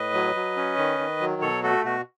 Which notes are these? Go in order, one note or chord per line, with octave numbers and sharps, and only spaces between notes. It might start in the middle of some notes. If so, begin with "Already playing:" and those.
Already playing: A2 B4 D#5
F#3
F#3
C#4
D#3
D#3
F#3
B2 A4 C#5
A3 F#4 A4
B2 F#4